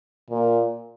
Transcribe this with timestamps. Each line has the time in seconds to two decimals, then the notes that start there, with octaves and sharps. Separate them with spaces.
0.30 A#2